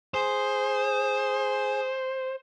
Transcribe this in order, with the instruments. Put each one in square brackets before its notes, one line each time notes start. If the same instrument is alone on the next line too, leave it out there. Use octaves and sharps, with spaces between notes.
[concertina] G#4 [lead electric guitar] C5